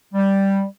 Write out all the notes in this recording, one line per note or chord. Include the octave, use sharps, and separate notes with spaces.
G3